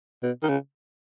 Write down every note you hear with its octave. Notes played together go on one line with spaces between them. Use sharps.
B2
D#3
C#3